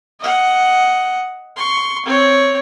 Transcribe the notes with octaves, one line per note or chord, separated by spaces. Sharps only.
D#5 F#5
C6 C#6
C4 C#5